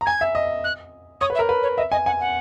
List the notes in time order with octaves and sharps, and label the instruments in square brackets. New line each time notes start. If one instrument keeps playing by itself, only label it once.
[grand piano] A#5
[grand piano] G#5 [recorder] G#6
[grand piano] E5
D#5
[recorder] F#6
[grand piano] C#5 [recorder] D#6
[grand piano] B4
[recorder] E5
[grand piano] A#4
B4
[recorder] C#5
[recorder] D#5 [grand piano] E5
[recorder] D#5 [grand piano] G#5
[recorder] F#5 [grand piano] G#5
[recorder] F#5